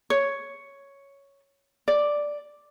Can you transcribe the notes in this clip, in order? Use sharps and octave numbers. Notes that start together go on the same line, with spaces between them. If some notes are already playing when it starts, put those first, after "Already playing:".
C#5
D5